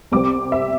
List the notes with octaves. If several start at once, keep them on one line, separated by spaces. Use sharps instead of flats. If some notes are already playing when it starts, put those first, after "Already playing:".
C2 C3 G3 C4 D6
E5